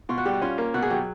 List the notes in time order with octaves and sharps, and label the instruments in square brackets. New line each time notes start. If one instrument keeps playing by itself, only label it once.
[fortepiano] B2 [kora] F4
[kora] F#4
[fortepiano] G3 [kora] G4
[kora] F#4
[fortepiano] C#4 [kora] F4
[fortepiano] A#3
[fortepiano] B2 [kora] F#4
[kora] G#4
[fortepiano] F#3 [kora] G4